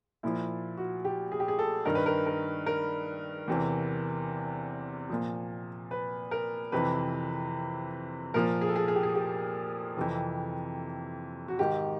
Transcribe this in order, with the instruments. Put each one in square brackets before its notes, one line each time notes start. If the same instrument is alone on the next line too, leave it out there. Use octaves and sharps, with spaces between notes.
[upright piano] A#2 F3 E4
F#4
G4
G#4
G4
G#4
A4
G2 D#3 A#4
B4
A#4
A#4
A#4
E2 C3 E3
A#2 F3
B4
A#4
F2 C3 E3 B4
A#2 F3 A#4
G#4
A4
G#4
G#4
G4
G#4
G4
F2 C3 E3
F#4
G#2 D#3 G4